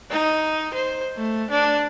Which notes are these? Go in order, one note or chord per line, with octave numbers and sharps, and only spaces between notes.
D#4
C5
A3
D4